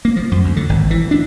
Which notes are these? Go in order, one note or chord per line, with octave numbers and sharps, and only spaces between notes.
A#3
F3
F#2
D2
D3
G#1
E3
D4